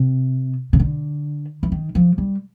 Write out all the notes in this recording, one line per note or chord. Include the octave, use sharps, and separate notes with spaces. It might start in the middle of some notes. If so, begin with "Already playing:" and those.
Already playing: C3
C#3
D3
E3
D#3
F3
G3